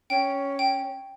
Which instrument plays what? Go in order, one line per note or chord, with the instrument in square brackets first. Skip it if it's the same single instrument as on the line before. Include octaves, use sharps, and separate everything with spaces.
[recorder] C#4 [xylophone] G5
[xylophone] G5